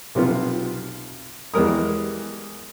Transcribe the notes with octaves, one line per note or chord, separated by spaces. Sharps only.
B1 C3 B3 F4
E2 G3 G#3 A#4 D#6